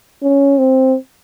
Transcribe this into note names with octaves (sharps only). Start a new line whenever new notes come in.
C#4
C4